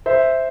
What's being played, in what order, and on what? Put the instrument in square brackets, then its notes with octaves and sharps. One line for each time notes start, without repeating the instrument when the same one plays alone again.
[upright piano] C5 E5